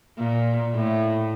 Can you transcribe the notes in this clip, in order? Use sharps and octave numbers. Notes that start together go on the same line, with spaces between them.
A#2
A2